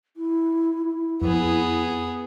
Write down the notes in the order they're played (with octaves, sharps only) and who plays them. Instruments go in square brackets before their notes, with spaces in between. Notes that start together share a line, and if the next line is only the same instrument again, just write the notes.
[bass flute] E4
E4
[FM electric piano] F2 [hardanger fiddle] B3 G#4